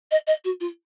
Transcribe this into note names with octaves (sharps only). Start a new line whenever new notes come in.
D#5
D#5
F#4
F4